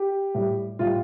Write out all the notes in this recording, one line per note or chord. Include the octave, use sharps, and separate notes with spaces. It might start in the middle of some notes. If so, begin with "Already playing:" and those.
Already playing: G4
A2 G3
A2 G3 F4